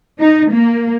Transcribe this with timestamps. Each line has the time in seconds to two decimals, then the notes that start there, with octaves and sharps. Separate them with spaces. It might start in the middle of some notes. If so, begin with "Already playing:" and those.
0.19 D#4
0.51 A#3